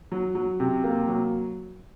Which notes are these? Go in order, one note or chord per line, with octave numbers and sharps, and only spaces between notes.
F#3
F#3
C3
A#3
F#3